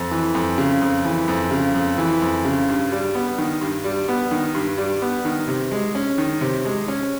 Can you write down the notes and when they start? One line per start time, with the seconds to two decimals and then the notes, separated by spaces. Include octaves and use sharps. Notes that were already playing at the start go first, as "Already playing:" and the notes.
Already playing: F2
0.11 E3
0.35 F2
0.58 C#3
0.81 F2
1.05 E3
1.28 F2
1.51 C#3
1.74 F2
1.98 E3
2.22 F2
2.45 C#3
2.68 G2
2.92 G3
3.15 B3
3.38 D#3
3.61 G2
3.84 G3
4.08 B3
4.31 D#3
4.55 G2
4.78 G3
5.02 B3
5.25 D#3
5.48 C3
5.72 G#3
5.95 C#4
6.18 D#3
6.41 C3
6.65 G#3
6.88 C#4